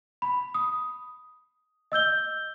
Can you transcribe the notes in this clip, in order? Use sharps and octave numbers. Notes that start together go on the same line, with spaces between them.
B5
D#6
D#5 E6 G6 G7